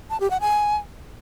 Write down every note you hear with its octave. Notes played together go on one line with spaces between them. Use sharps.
A5
G4
F#5
G#5